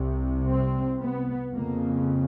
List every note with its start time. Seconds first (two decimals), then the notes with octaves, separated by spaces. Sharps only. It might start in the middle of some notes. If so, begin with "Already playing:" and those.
Already playing: C2 C3
0.48 C4
1.01 B3
1.52 F2 C#3 A#3